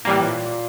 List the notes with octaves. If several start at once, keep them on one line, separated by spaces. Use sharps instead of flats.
A2 E3 G3 A#3
A#2